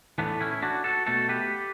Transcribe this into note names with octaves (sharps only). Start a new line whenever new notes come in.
A2 E3 A3 B3 D4
C#4 E4
D4 F#4
F#4 A4
B2 A3 F#4 A4
G4 B4